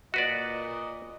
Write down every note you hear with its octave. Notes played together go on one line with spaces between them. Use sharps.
A#2 F#4 B4 D5 D#5